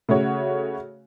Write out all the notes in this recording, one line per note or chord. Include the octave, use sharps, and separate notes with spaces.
C#3 A3 F#4 C#5